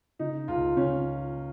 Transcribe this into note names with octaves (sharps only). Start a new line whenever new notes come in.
C#3 D#4
C#2 F4
C#2 C#4